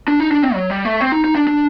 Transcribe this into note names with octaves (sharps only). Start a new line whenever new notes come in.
D4
D#4
D4
C4
F#3
G3
A3
C4
D#4
D#4
D4
D4